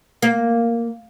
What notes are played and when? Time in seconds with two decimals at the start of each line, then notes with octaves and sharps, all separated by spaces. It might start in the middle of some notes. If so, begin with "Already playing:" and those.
0.22 A#3